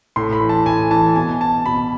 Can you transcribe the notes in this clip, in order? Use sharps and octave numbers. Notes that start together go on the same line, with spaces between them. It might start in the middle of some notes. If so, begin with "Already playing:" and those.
A2 C6
B5
E3
A5
A2 G#5
E3 A5
B2 G#5
A5
B2 B5